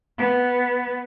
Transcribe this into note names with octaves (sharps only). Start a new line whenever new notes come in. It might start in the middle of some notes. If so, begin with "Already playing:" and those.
B3